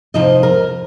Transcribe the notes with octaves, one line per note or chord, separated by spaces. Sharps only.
F2 C3 F3 D#4 D#5
A#4